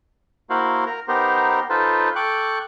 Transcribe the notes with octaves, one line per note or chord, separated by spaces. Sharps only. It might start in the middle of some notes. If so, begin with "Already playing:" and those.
A#3 E4 F#4 C5 F5
A#4
B3 D#4 G4 A#4 C5
D#4 F4 A4 B4 C5
A4 G5 C#6 D6 F#6